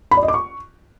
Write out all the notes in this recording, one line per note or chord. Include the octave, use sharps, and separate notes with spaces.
B5
D5
D#5
D6
C#6